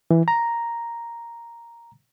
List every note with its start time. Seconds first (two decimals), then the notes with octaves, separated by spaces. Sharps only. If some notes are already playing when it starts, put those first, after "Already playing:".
0.11 E3
0.28 A#5